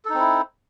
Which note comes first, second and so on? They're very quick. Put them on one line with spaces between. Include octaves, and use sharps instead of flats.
A4 D#4 C4 E4